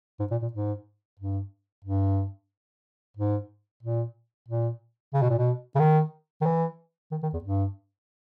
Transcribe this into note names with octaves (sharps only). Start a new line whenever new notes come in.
G#2
A#2
A#2
G#2
G2
G2
G#2
A#2
A#2
C#3
B2
A#2
B2
C#3
D#3
D#3
E3
D#3
D#3
E2
G2